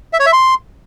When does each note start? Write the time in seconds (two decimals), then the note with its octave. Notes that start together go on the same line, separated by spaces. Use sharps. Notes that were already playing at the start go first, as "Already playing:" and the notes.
0.13 E5
0.20 C#5
0.26 E5
0.33 C6